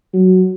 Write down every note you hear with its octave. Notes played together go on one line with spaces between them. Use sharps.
F#3